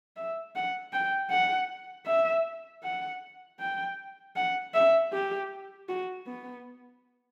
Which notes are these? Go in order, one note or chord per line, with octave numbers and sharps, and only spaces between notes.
E5
F#5
G5
F#5
E5
F#5
G5
F#5
E5
G4
F#4
B3